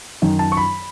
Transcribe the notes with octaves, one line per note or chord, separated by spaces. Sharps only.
F#2 D#3
A5
C#6
B5